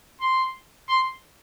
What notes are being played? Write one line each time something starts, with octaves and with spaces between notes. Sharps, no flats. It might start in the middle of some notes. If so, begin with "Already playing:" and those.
C6
C6